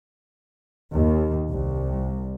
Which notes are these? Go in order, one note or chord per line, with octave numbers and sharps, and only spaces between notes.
D#2
C2